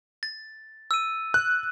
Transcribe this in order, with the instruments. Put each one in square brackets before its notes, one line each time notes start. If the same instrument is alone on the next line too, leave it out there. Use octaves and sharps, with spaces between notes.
[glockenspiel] A6
E6 D#7
[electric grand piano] F#6